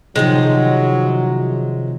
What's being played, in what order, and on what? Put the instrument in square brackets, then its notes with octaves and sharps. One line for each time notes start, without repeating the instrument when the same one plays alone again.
[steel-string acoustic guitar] C3 D#3 F3 [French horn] F#3 [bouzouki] G#3